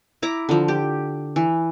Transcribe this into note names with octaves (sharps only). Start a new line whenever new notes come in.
E4 A#5 D6
D3 F3
G4
E3